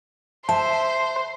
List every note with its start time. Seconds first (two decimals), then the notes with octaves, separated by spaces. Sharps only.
0.49 C5 E5 A5